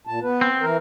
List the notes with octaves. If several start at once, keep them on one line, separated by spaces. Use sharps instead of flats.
A#2 A5
B3 B4
C4
E3 A#4